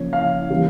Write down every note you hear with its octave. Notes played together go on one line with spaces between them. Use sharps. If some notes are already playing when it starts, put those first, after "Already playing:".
Already playing: C#3 F3 A#3 C#5
F5
C#3 E3 G3 A#3